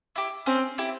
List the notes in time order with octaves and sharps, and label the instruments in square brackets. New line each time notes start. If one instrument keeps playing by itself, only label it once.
[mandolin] E4 G4
[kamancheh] C4 [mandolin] C#4
[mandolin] E4 G4